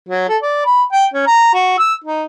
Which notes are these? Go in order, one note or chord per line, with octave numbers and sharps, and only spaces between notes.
F#3
A4
D5
B5
G5
C#4
A#5
F#4
E6
D#4